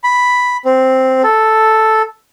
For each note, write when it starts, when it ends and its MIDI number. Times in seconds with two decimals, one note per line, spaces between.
0.04 0.57 83
0.65 1.22 60
1.24 2.02 69